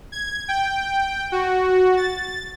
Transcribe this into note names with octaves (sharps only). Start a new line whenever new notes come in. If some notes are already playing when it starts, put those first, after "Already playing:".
G#6
G5
F#4
A6